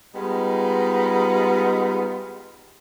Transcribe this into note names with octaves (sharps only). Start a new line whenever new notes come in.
G3 G#3 B3 D#4 F4